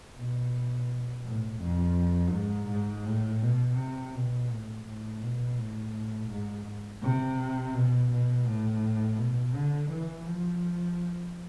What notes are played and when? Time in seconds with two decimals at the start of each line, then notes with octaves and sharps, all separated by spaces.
0.18 B2
1.26 A2
1.62 F2
2.34 G#2
2.70 G#2
3.06 A2
3.42 B2
3.78 C3
4.15 B2
4.51 A2
4.86 A2
5.22 B2
5.58 A2
6.30 G#2
7.02 C3
7.75 B2
8.11 B2
8.47 A2
9.18 B2
9.55 D3
9.91 E3
10.27 F3